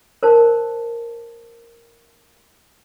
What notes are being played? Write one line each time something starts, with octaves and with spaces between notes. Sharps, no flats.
A#4 C5 D5 A5